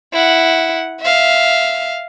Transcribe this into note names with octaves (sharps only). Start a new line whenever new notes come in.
E4 F#5
E5 F5